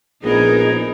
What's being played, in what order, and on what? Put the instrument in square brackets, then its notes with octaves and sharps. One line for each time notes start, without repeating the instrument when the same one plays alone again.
[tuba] A#1 [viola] B3 A#4 [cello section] D#4 [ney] G#4